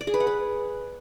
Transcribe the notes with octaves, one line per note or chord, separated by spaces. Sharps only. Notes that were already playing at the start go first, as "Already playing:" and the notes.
D5
G#4
B4
F#5
B4